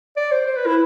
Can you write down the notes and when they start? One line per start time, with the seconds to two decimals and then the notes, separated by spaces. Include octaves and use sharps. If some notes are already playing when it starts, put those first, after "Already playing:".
0.17 D5
0.32 C5
0.46 C5
0.56 B4
0.66 E4